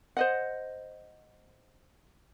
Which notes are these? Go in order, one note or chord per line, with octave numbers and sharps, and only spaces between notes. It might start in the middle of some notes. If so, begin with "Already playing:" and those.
C5 D#5 F#5